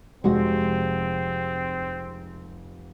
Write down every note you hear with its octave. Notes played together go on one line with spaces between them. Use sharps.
F1 G#3 C4 F#4